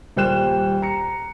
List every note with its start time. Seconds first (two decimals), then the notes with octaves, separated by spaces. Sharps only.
0.16 D#1 G3 C5 G5 F#6 E7
0.82 A#5 C#7